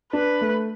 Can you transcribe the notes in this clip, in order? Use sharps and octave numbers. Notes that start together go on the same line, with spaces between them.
D4 B4
A3